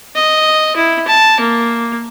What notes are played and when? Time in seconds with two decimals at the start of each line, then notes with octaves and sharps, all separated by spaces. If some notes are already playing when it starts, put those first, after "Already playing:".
0.15 D#5
0.76 E4
1.07 A5
1.40 A#3